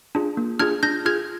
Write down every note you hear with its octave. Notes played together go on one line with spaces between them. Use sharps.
D4 F4 G#4
A#3
D4 F4 G#4 F6 G#6
D4 G6 A#6
F4 G#4 F6 G#6